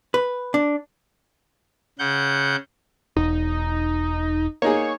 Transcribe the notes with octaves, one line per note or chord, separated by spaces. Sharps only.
B4
D4
C#3 F#5 G6
E1 D#4
A#3 D#4 G#4 C#5